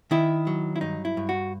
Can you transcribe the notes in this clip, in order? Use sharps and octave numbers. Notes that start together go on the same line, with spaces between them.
D#3 E4
F#3
E4
G2 D#4
E4
G2
F#4